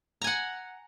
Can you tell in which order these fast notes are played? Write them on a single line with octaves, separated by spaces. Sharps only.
A#5 G#5 F#5